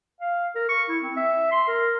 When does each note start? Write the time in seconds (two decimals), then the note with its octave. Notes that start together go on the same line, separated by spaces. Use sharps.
0.21 F5
0.55 A#4
0.69 C#6
0.89 E4
1.02 C4
1.17 E5
1.52 C6
1.68 A#4